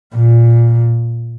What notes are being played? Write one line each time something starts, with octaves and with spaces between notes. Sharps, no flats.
A#2